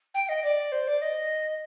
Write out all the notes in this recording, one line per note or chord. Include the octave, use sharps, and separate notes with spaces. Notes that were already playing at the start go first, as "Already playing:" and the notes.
G5
D#5
D5
C5
D5
D#5